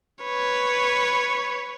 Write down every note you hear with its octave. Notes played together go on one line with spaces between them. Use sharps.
B4 C#5